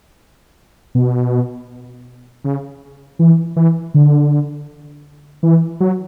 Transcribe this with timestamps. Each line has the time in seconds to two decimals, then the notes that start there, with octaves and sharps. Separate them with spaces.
0.95 B2
2.44 C#3
3.19 E3
3.56 E3
3.94 D3
5.43 E3
5.80 F#3